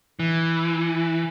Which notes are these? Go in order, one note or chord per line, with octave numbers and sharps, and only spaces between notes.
E3